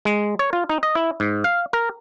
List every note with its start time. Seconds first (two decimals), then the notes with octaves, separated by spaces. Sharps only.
0.05 G#3
0.39 C#5
0.53 F4
0.69 D#4
0.83 D#5
0.95 E4
1.20 G#2
1.44 F5
1.73 A#4